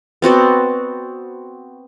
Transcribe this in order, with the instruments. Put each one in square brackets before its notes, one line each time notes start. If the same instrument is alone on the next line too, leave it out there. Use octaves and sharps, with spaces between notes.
[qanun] B3 C4 F#4 D5